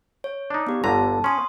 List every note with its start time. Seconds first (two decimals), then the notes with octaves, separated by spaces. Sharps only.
0.24 C#5
0.50 D4 D#4
0.67 B3 G4
0.84 G1 D3 A5 A#5
1.24 C#4 C6 D#6